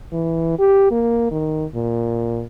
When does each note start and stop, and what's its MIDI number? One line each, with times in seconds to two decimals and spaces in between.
0.12 0.54 52
0.59 0.87 67
0.91 1.28 58
1.31 1.65 51
1.74 2.45 46